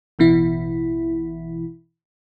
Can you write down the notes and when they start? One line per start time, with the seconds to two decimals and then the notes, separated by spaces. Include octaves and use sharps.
0.19 A1 B2 E3 E4